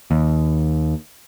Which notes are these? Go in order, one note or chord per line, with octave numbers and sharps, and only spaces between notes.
D#2